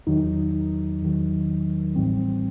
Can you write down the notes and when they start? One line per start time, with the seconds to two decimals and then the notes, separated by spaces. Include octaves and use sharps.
0.07 E2 D#3 F#3 D#4
1.02 E2 D#3 F#3
1.95 A1 A2 E3 G3 C4
2.20 C4